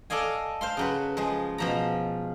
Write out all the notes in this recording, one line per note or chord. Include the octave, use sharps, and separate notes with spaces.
A4 D5 D#5 F5 G#5
C5 F5 C6
C#3 F#3 B4
F3 G#3
B2 F3 A#5